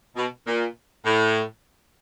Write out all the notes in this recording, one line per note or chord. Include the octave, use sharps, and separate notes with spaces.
B2
A#2
A2